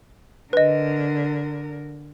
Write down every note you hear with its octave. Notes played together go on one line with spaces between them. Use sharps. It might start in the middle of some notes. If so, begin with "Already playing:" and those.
D3 A#4 B4 D#5